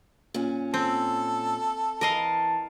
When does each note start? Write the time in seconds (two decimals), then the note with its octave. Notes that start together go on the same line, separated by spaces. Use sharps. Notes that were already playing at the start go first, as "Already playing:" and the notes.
0.34 A#2 C#4
0.74 C4 A4
2.01 E3 A#4 D#5 F5 A5